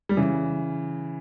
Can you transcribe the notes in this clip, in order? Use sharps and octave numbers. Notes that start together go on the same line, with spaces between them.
G3
C#3 E3